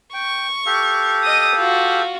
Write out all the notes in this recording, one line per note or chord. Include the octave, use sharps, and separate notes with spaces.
G5 C#6
G4 A4 F5
D#5 D#6
F4 F#4